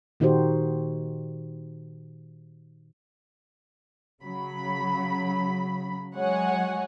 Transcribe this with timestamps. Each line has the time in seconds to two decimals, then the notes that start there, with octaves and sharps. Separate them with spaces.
0.20 A#2 D#3 D#4 F#4 G4 C5
4.23 C#3 F#3 B5
6.15 F#3 G#3 C#5 F#5 G#5